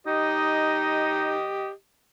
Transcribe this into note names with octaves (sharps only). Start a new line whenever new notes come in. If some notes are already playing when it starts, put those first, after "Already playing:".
D#4 G4 D#5